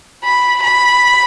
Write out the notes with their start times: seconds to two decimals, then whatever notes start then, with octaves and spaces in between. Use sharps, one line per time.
0.24 B5
0.62 B5